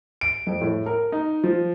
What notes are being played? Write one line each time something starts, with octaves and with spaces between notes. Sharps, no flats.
D7
F2
A2
A#4
D#4
F3